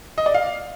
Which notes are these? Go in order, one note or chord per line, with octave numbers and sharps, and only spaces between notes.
D#5
D5
F5